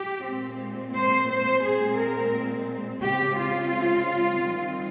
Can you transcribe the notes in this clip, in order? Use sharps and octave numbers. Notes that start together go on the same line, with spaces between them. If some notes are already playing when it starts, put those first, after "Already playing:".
Already playing: G4
A#2 G#3 C4
C5
C5
A#2 G#3 C4 G#4
A#4
C#3 G#3 C4 G4
F4
D#3 G3 C4